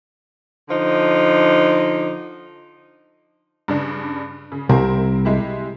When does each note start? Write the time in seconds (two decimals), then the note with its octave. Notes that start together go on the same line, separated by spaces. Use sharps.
0.69 D3 F3 D#4
3.68 G2 C#3 D4
4.52 C#3
4.69 C2 C4 E4 A#4
5.25 G#3 E4 G4